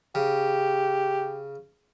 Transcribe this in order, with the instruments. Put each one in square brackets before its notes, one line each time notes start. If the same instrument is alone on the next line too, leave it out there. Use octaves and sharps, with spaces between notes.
[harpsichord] C#3 [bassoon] G4